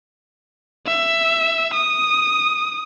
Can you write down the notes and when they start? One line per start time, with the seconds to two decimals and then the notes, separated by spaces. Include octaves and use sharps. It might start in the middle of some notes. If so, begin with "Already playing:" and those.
0.87 E5
1.74 D#6